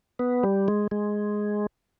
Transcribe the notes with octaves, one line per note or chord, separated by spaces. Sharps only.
B3
G3
G#3
G#3